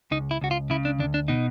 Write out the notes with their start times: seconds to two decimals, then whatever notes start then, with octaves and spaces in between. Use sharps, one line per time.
0.11 C#2 D#4
0.31 E4
0.41 C#2 F#4
0.51 F4
0.70 C#3 E4
0.85 D4
0.99 D2 D4
1.14 D4
1.28 B2 D#4